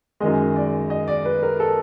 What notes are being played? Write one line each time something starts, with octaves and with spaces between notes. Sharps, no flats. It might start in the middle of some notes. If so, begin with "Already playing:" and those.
F#2 D#3 G#3 D#5
D5
D#5
D5
B4
A#4
A4